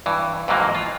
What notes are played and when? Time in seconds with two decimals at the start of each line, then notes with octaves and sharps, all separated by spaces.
0.06 G2 E3
0.48 F2 G#2 C3 E3 F#3 A#3
0.75 F4